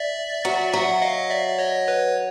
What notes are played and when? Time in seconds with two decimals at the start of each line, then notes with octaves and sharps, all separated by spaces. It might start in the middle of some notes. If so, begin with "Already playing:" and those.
Already playing: D5 E5
0.45 F#3
0.73 F#3 E5 F#5
1.02 D#5 F5
1.30 D5 E5
1.47 E5
1.59 C#5 D#5
1.87 B4 C#5